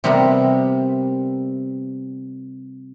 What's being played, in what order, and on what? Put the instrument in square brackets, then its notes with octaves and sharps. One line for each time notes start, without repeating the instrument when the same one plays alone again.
[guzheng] C3 G3 B3 G4 A#4